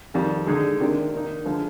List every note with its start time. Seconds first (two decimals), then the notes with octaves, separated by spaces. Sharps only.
0.14 F2 D#3 G3
0.47 D3 G#3 D#4 G#4
0.80 C3 D#3 A#3 D4 G4
1.13 D#3 A#3 D#4
1.45 D3 F3 G#3 D4